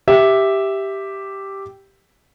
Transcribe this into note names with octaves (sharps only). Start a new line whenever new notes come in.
G4 E5